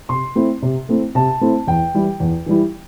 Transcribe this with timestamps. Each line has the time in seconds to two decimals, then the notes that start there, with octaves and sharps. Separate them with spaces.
0.09 C3 C6
0.35 A3 C4 E4
0.62 C3
0.89 A3 C4 E4
1.15 C3 A5
1.41 A3 C4 E4
1.67 E2 G5
1.94 E3 G3 E4
2.20 E2
2.46 E3 G3 E4